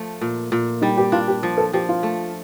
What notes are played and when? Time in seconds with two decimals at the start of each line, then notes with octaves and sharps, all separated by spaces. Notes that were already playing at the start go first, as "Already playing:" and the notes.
Already playing: F3 A3
0.21 A#2
0.52 A#2
0.81 G3 D#4
0.97 G4
1.12 D4 F4
1.28 G4
1.43 F3
1.58 A4
1.73 F3 G4
1.89 F4
2.03 A3